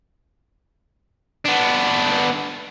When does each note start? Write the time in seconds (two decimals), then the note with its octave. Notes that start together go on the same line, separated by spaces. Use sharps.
1.45 B3 D4